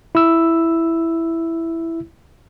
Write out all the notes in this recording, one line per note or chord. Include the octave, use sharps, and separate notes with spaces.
E4 E6